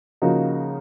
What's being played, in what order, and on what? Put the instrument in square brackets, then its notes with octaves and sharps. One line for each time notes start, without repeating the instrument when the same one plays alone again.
[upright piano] C#3 F3 A#3 D#4 F#4